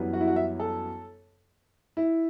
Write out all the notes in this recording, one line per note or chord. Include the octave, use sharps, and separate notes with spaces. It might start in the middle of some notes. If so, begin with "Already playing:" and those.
Already playing: F#2 E3 G3 B3
F#4
E4
F#4
E5
A4
E4